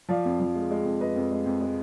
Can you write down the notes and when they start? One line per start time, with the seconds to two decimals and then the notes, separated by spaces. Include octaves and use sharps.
0.09 F3 D5 F5
0.25 F2
0.40 F3
0.55 G#3
0.71 G#3
0.85 F2
1.01 F2 B4 D#5
1.16 F2
1.31 G#3
1.46 F2
1.61 G#3